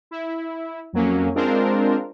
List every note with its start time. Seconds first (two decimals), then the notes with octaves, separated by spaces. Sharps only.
0.11 E4
0.93 F2 F#3 A#3 C#4
1.35 G#3 C4 D4 F4 A#4 C5